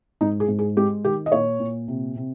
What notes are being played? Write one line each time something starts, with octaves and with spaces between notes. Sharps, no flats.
G#2 D#4
G#4
G#2
G#4
G#3 G4
D#3 G4
D#5
A#2 C#5
A#2
C3
C3